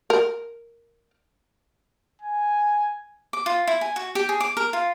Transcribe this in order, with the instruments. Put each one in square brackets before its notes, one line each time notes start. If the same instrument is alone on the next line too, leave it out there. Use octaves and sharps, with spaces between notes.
[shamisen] A#4
[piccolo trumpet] G#5
[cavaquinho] D6
F4
E4
G#5
F#4
G4
G#4
D6
A#4
F4